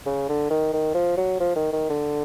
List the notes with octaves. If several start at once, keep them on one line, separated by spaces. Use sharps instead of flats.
C#3
D3
D#3
D#3
F3
F#3
F3
D#3
D#3
D3